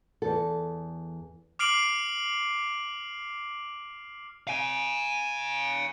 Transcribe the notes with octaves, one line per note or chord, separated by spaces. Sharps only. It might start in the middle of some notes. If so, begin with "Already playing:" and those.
E2 A4
D6 F6 C7 D7 F#7
F5 G#5